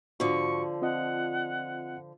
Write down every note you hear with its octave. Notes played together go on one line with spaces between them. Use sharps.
G#2 D3 F3 F#4 C#6
C4 F4 D#5 F#5